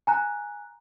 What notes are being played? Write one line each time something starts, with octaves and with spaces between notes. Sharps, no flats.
G#5 A#5 F#6